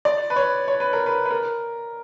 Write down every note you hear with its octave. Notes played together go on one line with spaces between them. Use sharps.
D5
B4
C#5
C#5
B4
A#4
B4
B4
A#4